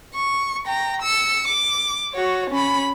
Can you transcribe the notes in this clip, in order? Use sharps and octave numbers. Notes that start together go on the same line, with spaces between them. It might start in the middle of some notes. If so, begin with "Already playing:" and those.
C#6
G5 A#5
E6 C#7
D6
F#4 C#5
C#4 B5